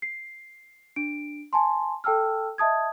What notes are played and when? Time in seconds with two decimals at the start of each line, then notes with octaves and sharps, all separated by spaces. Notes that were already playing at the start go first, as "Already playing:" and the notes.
0.02 C7
0.96 D4 D7
1.53 G#5 A5 C6
2.04 A4 G5 A5 E6 F6
2.58 D#5 E5 A5 D#6 G#6